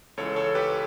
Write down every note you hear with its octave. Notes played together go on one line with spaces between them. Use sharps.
C#2 C#3 E3 A4 C#5
A4 C#5
G4 B4